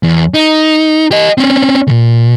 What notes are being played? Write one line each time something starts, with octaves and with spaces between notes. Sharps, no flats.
E2
D#4
G4 D#5
C4 C#4
D2 A#2